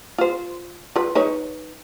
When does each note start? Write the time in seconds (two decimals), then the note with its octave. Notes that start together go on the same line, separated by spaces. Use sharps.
0.18 F4 C5
0.96 F4 B4
1.15 D#4 B4 C#5